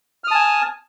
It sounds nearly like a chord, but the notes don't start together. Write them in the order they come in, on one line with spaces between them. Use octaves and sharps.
F6 D#6 A5 G#5